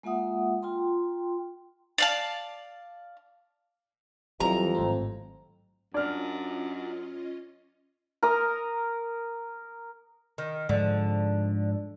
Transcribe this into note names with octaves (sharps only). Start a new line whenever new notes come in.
G#3 A#3 F4 E5 F#5 D#6
F4 G5 A#5 C6
D5 F5 A5
F2 E3 F#3 G3 A#5
G#1 A2 C4
F#2 C#4 D4 F4 D5 D#5 F6
A#4 D#6
D#3
G#2 D3 F3